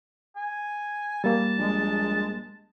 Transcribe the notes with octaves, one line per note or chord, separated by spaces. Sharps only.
G#5
G3 A#3 A5
A#1 G#3